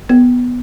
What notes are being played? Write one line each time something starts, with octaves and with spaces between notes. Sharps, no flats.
B3